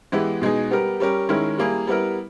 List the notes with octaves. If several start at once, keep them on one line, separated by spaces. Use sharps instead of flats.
E3 G#3 B3 E4 G4
B2 G#3 D#4 G#4
G3 B3 G4 A#4
G3 C#4 G4 A#4
D#3 G#3 C#4 E4 A#4
G3 A#3 E4 G#4
G3 B3 E4 A#4